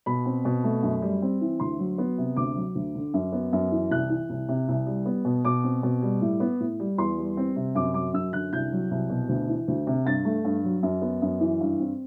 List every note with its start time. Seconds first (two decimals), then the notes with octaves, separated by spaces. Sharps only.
0.06 B2 B5
0.26 C4
0.45 B2
0.64 A3
0.83 F#2
1.02 G3
1.22 C4
1.41 E3
1.60 D2 C6
1.79 F#3
1.98 B3
2.18 C3
2.36 D2 D6
2.56 F#3
2.75 D2
2.95 D3
3.14 F#2
3.33 B3
3.53 F#2
3.71 E3
3.91 C2 F#6
4.10 E3
4.30 C2
4.49 C3
4.68 C2
4.87 G3
5.06 B3
5.25 B2
5.45 B2 D6
5.64 C4
5.83 B2
6.02 G3
6.22 A2
6.40 B3
6.60 A2
6.80 G3
6.98 E2 C6
7.18 G3
7.37 C4
7.56 C3
7.75 F#2 D6
7.94 F#3 D6
8.13 F#2 E6
8.33 D3 F#6
8.53 C2 G6
8.72 F#3
8.91 C2
9.10 B2
9.29 D2
9.48 E3
9.68 D2
9.87 C3
10.06 G2 A6
10.25 A3
10.44 G2
10.64 F#3
10.83 F#2
11.02 B3
11.22 F#2
11.40 E3
11.60 G2
11.80 C4